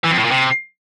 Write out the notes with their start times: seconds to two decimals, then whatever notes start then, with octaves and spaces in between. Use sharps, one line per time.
0.04 E3
0.11 F2
0.17 A2
0.24 A#2
0.31 C3